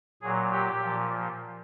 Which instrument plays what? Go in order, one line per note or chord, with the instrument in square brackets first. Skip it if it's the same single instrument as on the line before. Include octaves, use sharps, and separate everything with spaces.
[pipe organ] A#2 F#3 G#4
G4
A#2 F3